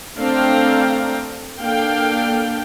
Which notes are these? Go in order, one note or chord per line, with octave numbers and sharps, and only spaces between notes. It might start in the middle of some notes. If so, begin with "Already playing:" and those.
A3 C4 D4 F5 G5 A#5
A#3 D4 A4 F5 G5